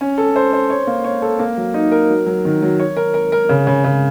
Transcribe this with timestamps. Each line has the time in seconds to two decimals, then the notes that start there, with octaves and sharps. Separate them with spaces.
0.01 C#4
0.18 A4
0.36 C5
0.53 C5
0.70 C#5
0.87 A#3
1.05 C#5
1.22 A4
1.39 A#3
1.57 F#3
1.74 D#4
1.92 A#4
2.09 F#3
2.26 F#3
2.45 D#3
2.62 F#3
2.80 C#5
2.97 A#4
3.14 A#4
3.32 A#4
3.49 C#3
3.67 C#3
3.84 C#3